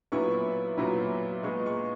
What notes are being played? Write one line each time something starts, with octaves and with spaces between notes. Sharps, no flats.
A#2 F#3 B3 E4 C#6
A#2 F#3 B3 E4
A#2 G#3 B3 C#6
C#6